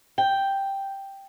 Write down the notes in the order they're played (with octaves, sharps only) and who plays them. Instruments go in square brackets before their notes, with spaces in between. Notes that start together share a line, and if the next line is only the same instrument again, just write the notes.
[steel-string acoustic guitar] G5